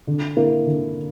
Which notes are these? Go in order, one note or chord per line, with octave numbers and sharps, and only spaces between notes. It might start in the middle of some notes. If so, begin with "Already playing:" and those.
D3
A#3 E4
D3